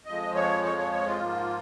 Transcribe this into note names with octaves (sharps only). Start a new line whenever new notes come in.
F2 F3 G#3 D#5
C#5
C#5
C#5
C#5
F4
G#2 F3 A#3